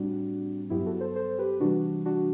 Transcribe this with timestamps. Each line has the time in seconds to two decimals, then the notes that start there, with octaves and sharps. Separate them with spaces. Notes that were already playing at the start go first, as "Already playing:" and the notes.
Already playing: A2 G3 C4 D4 F#4
0.70 G2 F#3 B3 E4 G4
0.86 F#4 A4
1.00 A4 C5
1.16 A4 C5
1.38 G4 B4
1.60 C3 E3 G3 D4 F#4
2.05 D4 F#4